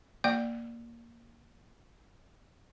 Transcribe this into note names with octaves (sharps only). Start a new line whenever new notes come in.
A#3 D5 G5